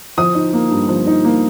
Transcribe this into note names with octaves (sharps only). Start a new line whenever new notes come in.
F3 D#6
D#4
A#3
G2
F3
D#4
A#3